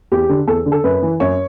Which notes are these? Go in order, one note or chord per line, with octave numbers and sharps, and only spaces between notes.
E2 G4
D3
E2 A4
D3
A4
F#2 B4
E3
F#2 C#5